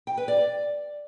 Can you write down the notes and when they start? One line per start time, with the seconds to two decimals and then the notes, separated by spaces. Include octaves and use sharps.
0.07 G5
0.18 B4
0.28 D5